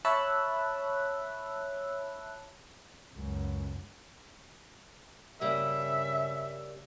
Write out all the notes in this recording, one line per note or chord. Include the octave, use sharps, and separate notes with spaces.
C#5 E5 A5 B5 E6 F#6
C#2 F#2
G2 C#3 G3 A#3 E5